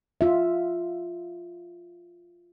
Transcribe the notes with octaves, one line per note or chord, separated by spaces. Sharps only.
F4 E5